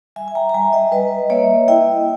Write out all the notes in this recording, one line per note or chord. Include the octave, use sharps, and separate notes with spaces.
G3 E5 G#5
G#5
G5 A#5
A#5
G3 E5 G#5
D#5 G5
G3 B4 D#5
A#3 C#5 E5
E4 D#5 G5